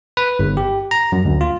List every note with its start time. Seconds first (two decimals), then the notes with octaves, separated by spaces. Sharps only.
0.17 B4
0.39 G1
0.57 G4
0.91 A#5
1.12 F#2
1.25 D2
1.41 F4